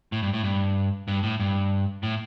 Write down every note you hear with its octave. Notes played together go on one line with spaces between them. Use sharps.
A2
G2
A2
G2
G2
A2
G2
A2